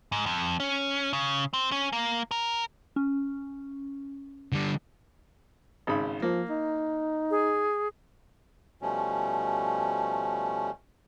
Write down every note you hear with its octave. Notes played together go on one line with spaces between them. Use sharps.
G#2
F2
C#4
C#3
C4
C#4
A#3
A#4
C#4
D3 G3
G#1 C#3 B5
F3 A#3
D#4
G#4
B2 F3 G3 A3 C#4